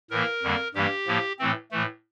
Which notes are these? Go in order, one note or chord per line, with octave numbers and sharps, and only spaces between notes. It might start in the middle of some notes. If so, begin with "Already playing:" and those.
A2 E3 A#3 A#4
F2 D3 G3 A#3
G2 E3 G3 A#3 G4
A2 F3 A#3
A2 E3 A3 C4
A2 E3 A3